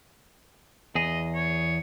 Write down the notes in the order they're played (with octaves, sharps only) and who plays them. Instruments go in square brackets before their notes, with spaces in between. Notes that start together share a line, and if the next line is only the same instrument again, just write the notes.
[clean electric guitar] E2 G#4 [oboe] D#5
[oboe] C#5